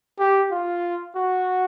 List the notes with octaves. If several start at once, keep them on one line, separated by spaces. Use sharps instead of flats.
G4
F4
F#4